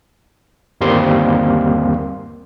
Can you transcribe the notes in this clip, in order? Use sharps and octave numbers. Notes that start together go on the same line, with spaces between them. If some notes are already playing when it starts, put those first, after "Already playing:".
G1 D#2 G3 A#3 C4 C6